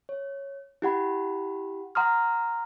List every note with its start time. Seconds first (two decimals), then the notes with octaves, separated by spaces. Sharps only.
0.09 C#5
0.82 E4 G4 F#5 B5
1.95 F#5 A#5 C6 D#6 F6